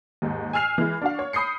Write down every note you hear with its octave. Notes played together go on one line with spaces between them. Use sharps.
D#2 G#2
G#5 E6 F6 C7 F7
E3 G#3 E4
D4 F#4 F5
C#5 C#6
B5 D#6 G6 C7 C#7